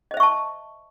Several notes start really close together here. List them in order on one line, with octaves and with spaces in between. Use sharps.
D#5 C5 E5 C#6 A5